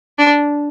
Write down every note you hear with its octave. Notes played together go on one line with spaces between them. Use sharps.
D4